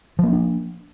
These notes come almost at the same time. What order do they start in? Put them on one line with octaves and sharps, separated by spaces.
F3 A#3 C#4 D4